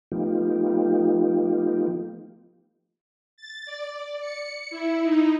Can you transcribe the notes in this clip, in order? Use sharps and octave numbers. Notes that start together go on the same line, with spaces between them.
F3 A3 B3 D#4 F4 G4
A6
D5
C#7
E4
D#4